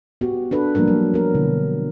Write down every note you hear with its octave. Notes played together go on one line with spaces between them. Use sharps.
B3 F#4 G4
D4 A4 B4
F3 G3 A#3 D4 A#4
F#3
B3 A#4
B2 D3 E4